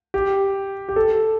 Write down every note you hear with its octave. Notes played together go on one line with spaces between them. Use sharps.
G4
G4
A4